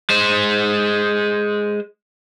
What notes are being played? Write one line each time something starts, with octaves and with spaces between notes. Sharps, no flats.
G#3 C5